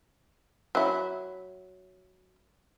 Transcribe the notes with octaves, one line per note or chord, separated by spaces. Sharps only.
F#3 E4